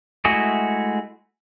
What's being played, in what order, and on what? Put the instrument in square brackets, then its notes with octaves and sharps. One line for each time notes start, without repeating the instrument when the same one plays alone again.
[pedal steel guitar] G#3 A3 E4 F#4 G#4